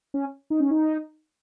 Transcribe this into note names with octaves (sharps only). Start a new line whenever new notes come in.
C#4
D#4
C#4
D#4